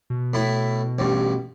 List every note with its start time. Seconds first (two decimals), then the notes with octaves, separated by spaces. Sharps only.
0.10 B2
0.34 A2 E4
0.99 A1 G2